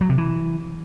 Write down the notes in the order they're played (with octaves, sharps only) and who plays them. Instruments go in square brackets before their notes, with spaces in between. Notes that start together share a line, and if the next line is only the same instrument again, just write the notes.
[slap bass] F#3
C3
E3